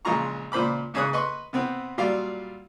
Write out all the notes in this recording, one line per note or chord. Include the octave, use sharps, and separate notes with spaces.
A#1 C#3 G#3 F4 A#5 C#6
C#2 A#2 C5 B5 D6
G#2 C#3 G#4 C#5 D#6 F#6
B4 D#5 C6 C#6
C3 B3 C4
A#2 F#3 G3 F4 D5 F5